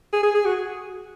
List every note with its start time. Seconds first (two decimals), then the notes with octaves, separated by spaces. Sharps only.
0.13 G#4
0.23 G#4
0.35 G#4
0.45 F#4